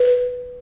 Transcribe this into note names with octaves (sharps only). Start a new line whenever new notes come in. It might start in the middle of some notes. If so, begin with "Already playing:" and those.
Already playing: B4